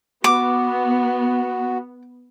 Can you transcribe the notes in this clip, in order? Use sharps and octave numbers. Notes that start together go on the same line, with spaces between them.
B3 F#4 D6